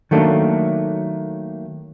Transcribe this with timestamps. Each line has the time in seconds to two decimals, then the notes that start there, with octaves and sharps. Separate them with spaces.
0.11 D#3 F#3 A3 A#3 C#4 D4